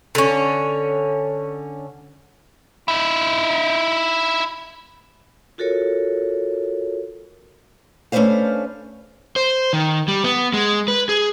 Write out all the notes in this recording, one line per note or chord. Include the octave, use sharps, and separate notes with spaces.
D3 C#4
D#4 E4
F4 F#4 A4 A#4 C#5
A3 C#4 D4 B4 C5 F5
C5
D#3
G3
B3
G#3
B4
G#4